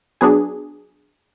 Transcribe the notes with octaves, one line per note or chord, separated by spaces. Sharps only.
F#3 B3 D4 G#4